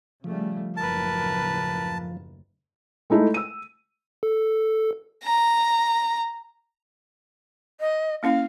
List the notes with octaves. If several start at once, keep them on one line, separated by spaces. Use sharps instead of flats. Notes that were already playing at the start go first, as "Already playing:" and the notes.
C#3 F3 G3 A3
F#1 D#2 A2 A#4 B4 A5
G#3 A3 D#4 E4 A4
E6 D#7
A4
A#5
D#5
A#3 C#4 E4 F5